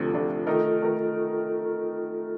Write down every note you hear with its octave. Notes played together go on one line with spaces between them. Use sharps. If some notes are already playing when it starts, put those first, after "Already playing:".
Already playing: D2 C3 F3 A3 D4 F4 A4
D2 C3 F3 A3 D4
D#3 A3 D#4 F4 A4 A#4
D#3 A3 D#4 A#4